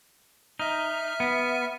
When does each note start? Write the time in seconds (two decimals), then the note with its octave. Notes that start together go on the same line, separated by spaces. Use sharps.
0.59 D#4 E5 F6
1.20 B3